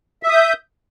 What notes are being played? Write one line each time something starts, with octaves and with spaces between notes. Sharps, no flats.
E5 D#6 G6